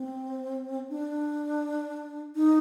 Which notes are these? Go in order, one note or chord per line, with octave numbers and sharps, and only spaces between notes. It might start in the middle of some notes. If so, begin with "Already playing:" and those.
Already playing: C4
D4
D#4